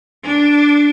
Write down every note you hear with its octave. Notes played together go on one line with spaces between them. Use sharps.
D4